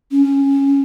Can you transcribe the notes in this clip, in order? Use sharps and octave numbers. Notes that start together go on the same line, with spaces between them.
C#4